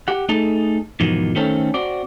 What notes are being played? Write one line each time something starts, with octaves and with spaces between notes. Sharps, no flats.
G4 F#5
A3 D#4 G#4 A4
E2 G#2 B2 D#3 F3
D#3 A3 C4 C#4 A4
C4 F#4 D5